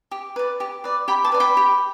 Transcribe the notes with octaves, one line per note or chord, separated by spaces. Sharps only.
G4
B4 D5
G4
B4 D5
G4 G5 B5
A5 D6
B4 D5
G5 B5
G4